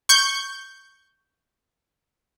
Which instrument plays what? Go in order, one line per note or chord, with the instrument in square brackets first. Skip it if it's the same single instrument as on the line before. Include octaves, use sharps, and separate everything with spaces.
[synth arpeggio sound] C#6 G6